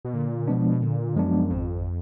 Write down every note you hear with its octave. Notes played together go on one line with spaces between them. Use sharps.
B2
A#2 D3
B2 F3 G#3 B3 D4
A#2 D3
F#2 F3 G#3 B3 D4
G#1 F2